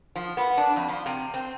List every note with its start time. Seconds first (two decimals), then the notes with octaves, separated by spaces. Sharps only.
0.15 F3
0.37 B3
0.57 D4
0.76 F2
0.88 F3
1.06 C3
1.34 C4